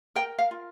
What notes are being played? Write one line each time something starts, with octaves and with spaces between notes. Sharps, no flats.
A#4 G5
F5
F4